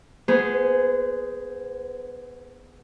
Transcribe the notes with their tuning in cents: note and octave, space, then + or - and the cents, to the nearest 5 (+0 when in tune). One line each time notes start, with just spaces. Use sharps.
B3 +0 G#4 +0 C5 -30